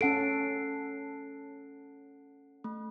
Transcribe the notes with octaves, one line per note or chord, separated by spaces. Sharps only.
C#4 A4 F#5 C7 D7
A3